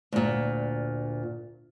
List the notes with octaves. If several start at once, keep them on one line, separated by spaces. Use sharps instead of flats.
D2 A#2